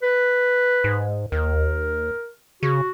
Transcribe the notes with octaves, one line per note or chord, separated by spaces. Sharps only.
B4
G#2
D#2 A#4
C#3 F#4